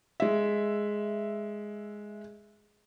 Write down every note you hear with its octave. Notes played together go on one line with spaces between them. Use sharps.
G#3 E5